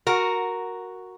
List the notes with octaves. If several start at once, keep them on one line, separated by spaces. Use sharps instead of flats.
F#4 A#4